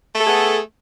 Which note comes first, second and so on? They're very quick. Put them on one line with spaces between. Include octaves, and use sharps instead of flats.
A3 A4 G#4 B3